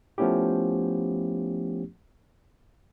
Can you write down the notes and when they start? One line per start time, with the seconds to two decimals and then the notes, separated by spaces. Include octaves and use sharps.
0.18 F3 A3 B3 C#4 E4 G4